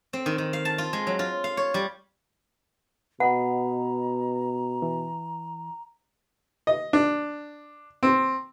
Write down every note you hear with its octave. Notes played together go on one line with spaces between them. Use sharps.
C4
D#3
D#3
F5
A5
F4
G#3
F#3
F4
F5
C#5
G3
B2 B4 D#5 F#5 A#5 B5
E3
D#5
D4
C4